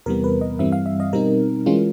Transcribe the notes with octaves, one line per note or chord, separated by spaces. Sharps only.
E2 C3 E3 G3 B3 A#4
B4
D#5
G2 E3 G3 C4 E5
F5
E5
D#5
B2 G3 C4 D#4 A#4
E3 G#3 C#4 F4